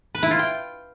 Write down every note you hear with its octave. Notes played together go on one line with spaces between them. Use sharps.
B4
E4
F4
G5